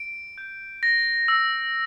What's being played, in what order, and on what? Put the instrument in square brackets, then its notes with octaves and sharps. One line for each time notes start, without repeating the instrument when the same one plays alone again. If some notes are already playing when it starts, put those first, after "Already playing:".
Already playing: [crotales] D7
G6
A#6
E6